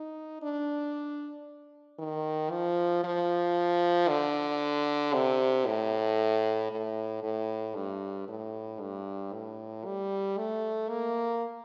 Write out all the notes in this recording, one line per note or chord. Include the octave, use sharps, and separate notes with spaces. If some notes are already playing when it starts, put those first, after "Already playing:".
Already playing: D#4
D4
D#3
F3
F3
D3
C3
A2
A2
A2
G2
A2
G2
A2
G3
A3
A#3